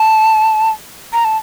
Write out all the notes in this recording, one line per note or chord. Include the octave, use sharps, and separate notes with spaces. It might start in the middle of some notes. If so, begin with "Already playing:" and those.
Already playing: A5
A#5
A5